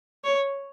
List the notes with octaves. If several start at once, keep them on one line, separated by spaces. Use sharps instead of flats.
C#5